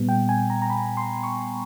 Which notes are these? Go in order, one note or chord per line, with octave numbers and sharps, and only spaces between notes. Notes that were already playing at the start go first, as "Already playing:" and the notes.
Already playing: A#2 G3 B3
G5
G#5
A#5
A#5
B5
C6
C#6